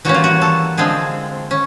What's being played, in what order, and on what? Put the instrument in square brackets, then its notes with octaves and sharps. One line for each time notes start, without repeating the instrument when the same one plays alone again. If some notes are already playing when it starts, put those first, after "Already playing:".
[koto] E3 G3 A#3 C#4 F#4
F4
F#4
A4
D3 F3 G#3 C4 G#4
C#4